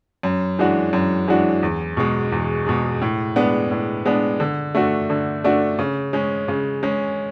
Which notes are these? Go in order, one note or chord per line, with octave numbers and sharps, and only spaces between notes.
F#2
E3 G#3 D4 F#4
F#2
E3 G#3 D4 F#4
E2
B2 G#3
E2
B2 G#3
A2
G#3 B3 D4
A2
G#3 B3 D4
D3
A3 D4 F#4
D3
A3 D4 F#4
C#3
G#3 C#4
C#3
G#3 C#4